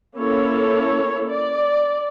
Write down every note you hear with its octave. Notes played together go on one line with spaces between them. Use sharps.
A#3 C#4 E4 A4 C#5
D5